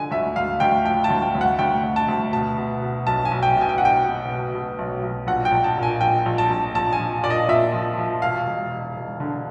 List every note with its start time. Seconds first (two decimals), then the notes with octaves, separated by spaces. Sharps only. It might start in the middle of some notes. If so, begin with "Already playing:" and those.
Already playing: D3 F3 G#5
0.11 D2 E5
0.36 D2 F5
0.60 D2 G5
0.85 F3 G5
1.04 A5
1.10 D2
1.22 G5
1.35 D2
1.41 F#5
1.59 D2 G5
1.83 D2
1.96 A5
2.08 D2
2.32 B2 A5
2.58 B2
2.82 B2
3.06 B1 A5
3.25 G#5
3.31 B1
3.43 G5
3.56 B2
3.61 G#5
3.69 G5
3.78 B2 F#5
3.85 G5
4.05 B2
4.29 B2
4.53 B2
4.79 B1
5.03 B1
5.27 A#1 F#5
5.45 G5
5.52 A#1
5.64 A5
5.77 A#2
5.83 G#5
6.01 A#1 G5
6.26 A#1
6.38 A5
6.50 A#1
6.75 A#1 A5
6.93 G#5
6.99 F3
7.24 A#2 D5
7.30 D#5
7.49 A#2 E5
7.74 F3
7.98 F3
8.22 E1 F5
8.47 E1
8.71 E1
8.96 E1
9.20 D3